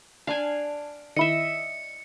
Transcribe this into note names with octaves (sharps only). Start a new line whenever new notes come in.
D4 D5 F5 G#5 A5
D#3 E4 D#5 E5 C#7